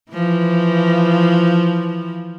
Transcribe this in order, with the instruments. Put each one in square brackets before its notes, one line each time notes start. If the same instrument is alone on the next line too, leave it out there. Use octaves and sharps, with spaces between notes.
[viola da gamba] E3 F3